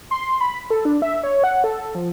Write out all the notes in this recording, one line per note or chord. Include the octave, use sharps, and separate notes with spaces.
C6
B5
A4
D4
E5
C#5
F#5
A4
F3